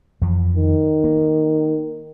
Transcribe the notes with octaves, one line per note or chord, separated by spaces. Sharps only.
F2 E3 F3
D#3
A#3